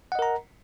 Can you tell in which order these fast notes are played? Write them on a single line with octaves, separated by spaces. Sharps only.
F#5 D#5 A#4 A#5